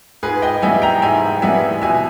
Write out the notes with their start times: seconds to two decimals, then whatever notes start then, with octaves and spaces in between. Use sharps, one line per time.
0.23 G#2 G#4 B4
0.42 D#5 G5
0.62 E3 G3 B3 E5 G#5
0.82 G5 A#5
1.02 G#2 E5 G#5
1.42 E3 G3 B3 E5 G#5
1.82 B2 E5 G#5